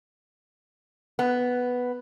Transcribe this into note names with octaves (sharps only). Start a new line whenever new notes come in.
B3